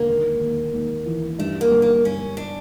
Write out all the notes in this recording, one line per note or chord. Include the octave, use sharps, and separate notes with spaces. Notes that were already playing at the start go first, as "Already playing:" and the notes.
Already playing: E1 D3 A#3
D#2
D#2
D#2
E3
G2 A3
A#3
G1
A#3
G2 C#4
D4